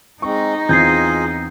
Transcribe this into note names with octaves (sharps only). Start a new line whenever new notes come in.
G#3 C4 D#4 C#6
E2 C4 F4 G#4 G#5 G6 G#6 C7